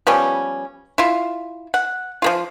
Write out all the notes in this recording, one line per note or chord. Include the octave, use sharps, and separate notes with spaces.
F3 G3 B3 C#4
E4 F4
F#5
F3 A#3 F4